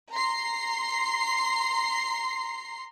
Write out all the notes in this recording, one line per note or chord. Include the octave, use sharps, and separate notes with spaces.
A#5 C6 C7